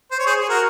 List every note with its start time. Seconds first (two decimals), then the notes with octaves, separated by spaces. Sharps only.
0.11 C5
0.19 C#5
0.26 G#4 C5
0.40 G#4
0.49 F#4 A#4